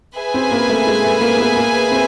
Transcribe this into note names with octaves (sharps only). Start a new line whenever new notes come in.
G#4 B4 E5 G#5
C4
A#3
A3
G#3
A3
A#3
B3
A#3
C4